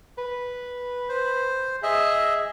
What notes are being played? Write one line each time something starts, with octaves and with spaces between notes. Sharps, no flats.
B4
C5
G#4 D#5 E5